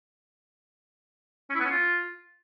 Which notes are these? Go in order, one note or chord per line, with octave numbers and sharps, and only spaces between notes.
C#4
E4
B3
C#4
F4